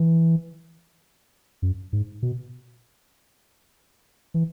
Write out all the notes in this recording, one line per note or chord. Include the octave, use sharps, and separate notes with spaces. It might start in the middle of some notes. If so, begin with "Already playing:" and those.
Already playing: E3
F#2
G#2
B2
E3